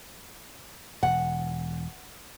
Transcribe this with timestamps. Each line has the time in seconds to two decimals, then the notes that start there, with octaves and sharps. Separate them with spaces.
1.03 E1 F#5